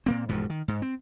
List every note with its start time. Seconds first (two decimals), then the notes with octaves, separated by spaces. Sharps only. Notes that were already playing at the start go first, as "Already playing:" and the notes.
0.06 A#2 A#3 C4
0.29 E1 D2 G#2 F3
0.50 D#3
0.68 G#2
0.82 C4